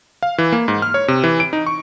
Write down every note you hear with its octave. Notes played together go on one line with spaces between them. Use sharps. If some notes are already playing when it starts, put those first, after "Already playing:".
F5
E3
A#3
G#2
F6
C#5
C3
E3
D7
D#4
C#6